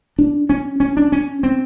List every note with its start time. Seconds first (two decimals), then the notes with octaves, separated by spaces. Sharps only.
0.19 D4
0.49 C#4
0.80 C#4
0.97 D4
1.12 C#4
1.43 C4